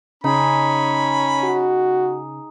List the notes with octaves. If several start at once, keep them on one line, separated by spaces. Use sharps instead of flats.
C#3 C#4 D#4 G#4 B5
F#4